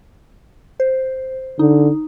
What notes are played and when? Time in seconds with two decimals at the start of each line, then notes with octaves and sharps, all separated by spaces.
0.80 C5
1.59 D3 D#4